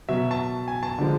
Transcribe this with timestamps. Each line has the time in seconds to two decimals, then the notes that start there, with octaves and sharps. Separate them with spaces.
0.08 B2 F#3 E5
0.31 A5
0.68 G#5
0.83 A5
0.98 D3 F3 G#3